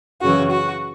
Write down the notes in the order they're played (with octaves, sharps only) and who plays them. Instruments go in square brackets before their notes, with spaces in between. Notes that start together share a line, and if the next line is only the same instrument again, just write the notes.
[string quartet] F#2 C#3 E3 F#4
F#4